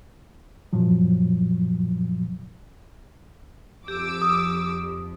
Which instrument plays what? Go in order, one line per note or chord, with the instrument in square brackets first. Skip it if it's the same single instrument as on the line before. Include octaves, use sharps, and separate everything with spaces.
[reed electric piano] F#2 A#2 F3 F#3
[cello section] F2 [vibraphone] G4 [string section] D6 E6
[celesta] D#6